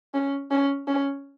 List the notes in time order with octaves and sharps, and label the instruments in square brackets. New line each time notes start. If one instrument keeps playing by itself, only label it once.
[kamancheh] C#4
C#4
C#4